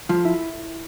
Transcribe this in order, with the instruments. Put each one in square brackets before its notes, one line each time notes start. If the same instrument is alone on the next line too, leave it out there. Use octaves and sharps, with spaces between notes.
[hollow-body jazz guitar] F3 [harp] F4
[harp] E4